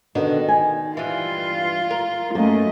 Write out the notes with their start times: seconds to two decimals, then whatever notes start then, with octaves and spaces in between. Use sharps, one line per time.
0.15 B2 D3 D#3 B3
0.48 G#5
0.97 G2 E3 F4
1.90 A#4
2.35 F#2 A3 A#3 D#5